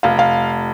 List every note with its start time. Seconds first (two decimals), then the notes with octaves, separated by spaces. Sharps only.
0.03 F1 F5
0.19 F5